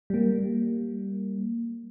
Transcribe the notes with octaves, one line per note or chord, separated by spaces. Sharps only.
G3 A#3